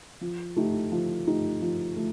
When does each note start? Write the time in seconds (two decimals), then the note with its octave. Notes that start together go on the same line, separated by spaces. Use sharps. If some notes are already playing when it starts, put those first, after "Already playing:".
0.21 F3
0.56 A3 D#4 G4
0.92 F3
1.27 A3 D#4 G4
1.62 F3
1.96 A3